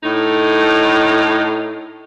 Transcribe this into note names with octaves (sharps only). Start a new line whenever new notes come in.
A2 D#4